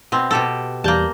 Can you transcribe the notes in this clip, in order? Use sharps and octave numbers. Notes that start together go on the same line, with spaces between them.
B2 C4
B2 G4 A4
E2 G3 A#3 A5 G6